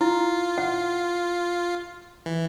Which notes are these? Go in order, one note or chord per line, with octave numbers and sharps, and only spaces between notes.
E4 F4
F#5
E3